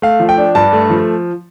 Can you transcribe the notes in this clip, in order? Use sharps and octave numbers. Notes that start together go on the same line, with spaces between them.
A3 F5
F3
G5
D4
G2 A5
A3
F3